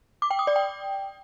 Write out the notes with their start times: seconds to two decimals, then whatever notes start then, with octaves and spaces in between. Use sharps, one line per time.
0.22 D6
0.31 G5
0.39 D#6
0.47 D5
0.56 G5